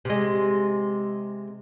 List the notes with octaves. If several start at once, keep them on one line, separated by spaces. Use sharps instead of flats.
C3 G#3